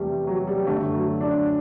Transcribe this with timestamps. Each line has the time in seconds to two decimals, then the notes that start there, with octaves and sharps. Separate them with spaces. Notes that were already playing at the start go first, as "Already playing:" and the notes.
Already playing: E2 C3 G3 A3
0.27 F#3
0.47 G3
0.67 F#2 D3 A3
0.94 F#3
1.20 D4